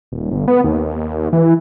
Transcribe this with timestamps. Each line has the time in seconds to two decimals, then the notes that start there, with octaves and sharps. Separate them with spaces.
0.12 D#1
0.31 G1
0.48 B3
0.64 D#2
1.33 E3